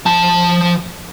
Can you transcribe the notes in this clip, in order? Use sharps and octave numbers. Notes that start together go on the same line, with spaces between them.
F3 A5